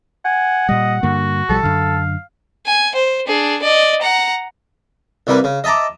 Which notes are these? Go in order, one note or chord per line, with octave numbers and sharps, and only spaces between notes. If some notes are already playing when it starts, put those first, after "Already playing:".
F#5 G#5
A#2 G3 D#5
G2 D3 A#3 F#4
B1 F3 G3 A4
F#2 D3 F5
G#5
C5
D4 G#4
D5 D#5
F#5 A#5
C2 C3 G3 A#3 B4
C#3
D#5 E5 A5 A#5 D6